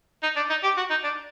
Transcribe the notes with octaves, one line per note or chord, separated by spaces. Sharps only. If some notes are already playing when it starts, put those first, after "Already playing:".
D#4
D4
D#4
G4
F#4
D#4
D4